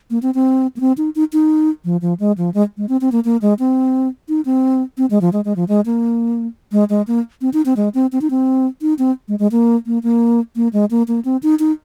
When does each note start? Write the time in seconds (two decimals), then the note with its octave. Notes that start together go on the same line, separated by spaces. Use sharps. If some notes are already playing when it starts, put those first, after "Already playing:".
0.10 A#3
0.22 C4
0.35 C4
0.77 A#3
0.80 C4
0.97 D#4
1.16 D#4
1.33 D#4
1.85 F3
2.02 F3
2.20 G#3
2.38 F3
2.54 G#3
2.77 G#3
2.89 C4
3.01 C4
3.12 A#3
3.25 A#3
3.42 G#3
3.59 C4
4.29 D#4
4.45 C4
4.98 C4
5.10 G#3
5.21 F3
5.33 G#3
5.45 G#3
5.56 F3
5.68 G#3
5.86 A#3
6.72 G#3
6.90 G#3
7.07 A#3
7.41 C4
7.53 D#4
7.66 C4
7.77 G#3
7.94 C4
8.12 C4
8.21 D#4
8.30 C4
8.82 D#4
8.99 C4
9.28 G#3
9.39 G#3
9.52 A#3
9.86 A#3
10.03 A#3
10.56 A#3
10.73 G#3
10.91 A#3
11.08 A#3
11.25 C4
11.43 D#4
11.59 D#4